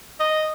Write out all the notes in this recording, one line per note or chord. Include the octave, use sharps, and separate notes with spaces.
D#5